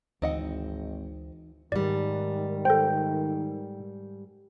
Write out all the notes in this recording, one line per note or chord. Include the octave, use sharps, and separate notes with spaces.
G#1 D2 E3 C4 D#4 D#5 F#5
G#2 D#3 G3 D5
A4 C5 G5